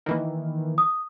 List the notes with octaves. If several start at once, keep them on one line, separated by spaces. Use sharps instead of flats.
D#3 E3 A#3
D#6